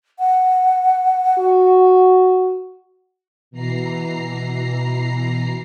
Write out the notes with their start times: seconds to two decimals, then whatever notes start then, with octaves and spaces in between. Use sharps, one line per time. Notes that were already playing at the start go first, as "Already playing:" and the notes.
0.19 F#5
1.38 F#4
3.51 B2 E3 A#5 C7